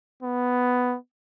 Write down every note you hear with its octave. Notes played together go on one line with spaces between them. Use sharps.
B3